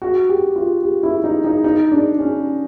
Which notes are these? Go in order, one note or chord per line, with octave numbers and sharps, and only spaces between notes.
F#4
G4
F4
G4
E4
D#4
D#4
D#4
D4
C#4